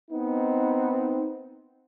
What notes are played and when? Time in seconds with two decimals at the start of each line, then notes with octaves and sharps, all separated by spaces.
0.11 B3 C4 D#4